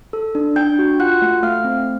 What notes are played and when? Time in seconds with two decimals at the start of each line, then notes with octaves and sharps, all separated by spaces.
0.13 A4
0.35 D4
0.56 D4 G5 G6
0.79 F#4
1.00 F4 F#5 F#6
1.22 A3
1.43 A3 F5 F6
1.65 C4